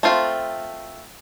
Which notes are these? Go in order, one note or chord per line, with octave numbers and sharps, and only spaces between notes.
A3 C4 F4